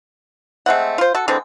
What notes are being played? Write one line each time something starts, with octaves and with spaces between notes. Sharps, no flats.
G#3 A3 C4 F#5
F4 C5
F#4 A4
D3 E3 G#3 C4